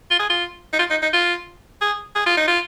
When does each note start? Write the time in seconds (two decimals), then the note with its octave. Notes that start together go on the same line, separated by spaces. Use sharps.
0.10 F4
0.19 G#4
0.29 F4
0.73 D#4
0.79 F4
0.90 D#4
1.02 D#4
1.13 F4
1.81 G#4
2.15 G#4
2.26 F4
2.37 D#4
2.48 F4